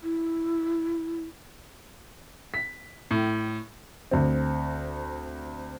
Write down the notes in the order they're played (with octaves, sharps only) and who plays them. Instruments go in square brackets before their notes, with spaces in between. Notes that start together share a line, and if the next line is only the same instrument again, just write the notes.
[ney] E4
[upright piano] B6
A2
D2 C4